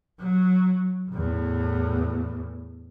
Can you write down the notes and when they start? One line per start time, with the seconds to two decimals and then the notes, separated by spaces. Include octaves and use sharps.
0.19 F#3
1.10 E2 A2